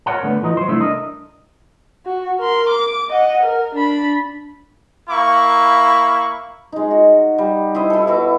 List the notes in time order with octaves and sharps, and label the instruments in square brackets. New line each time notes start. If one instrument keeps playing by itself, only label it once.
[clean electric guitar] A#4 C#5 D5 F#5 A5
D3 A3 B3
E3 F3 D#4
F#3 C5
C2 A3 D4 E4 E5
D4 A#4 D#5
[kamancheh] F#4
A#4 C6
D6
D#5 F#5
A#4
D4 B5
[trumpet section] A#3 E4 C#6
[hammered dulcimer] G#3 D#4
F#4
G3
E4 C5 D#5
E4 A4
B2 F#4 D6